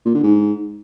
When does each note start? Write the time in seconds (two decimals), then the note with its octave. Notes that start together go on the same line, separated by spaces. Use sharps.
0.06 A#2
0.14 D3
0.23 G#2